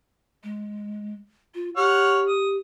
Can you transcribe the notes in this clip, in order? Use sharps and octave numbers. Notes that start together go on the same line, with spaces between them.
G#3
F4
G4 C#5 F#5 F6
D#6